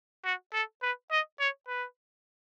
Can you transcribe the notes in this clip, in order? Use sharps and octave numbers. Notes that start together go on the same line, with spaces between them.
F#4
A4
B4
D#5
C#5
B4